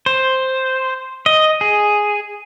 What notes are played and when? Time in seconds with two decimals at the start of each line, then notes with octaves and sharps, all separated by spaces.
0.06 C5
1.26 D#5
1.61 G#4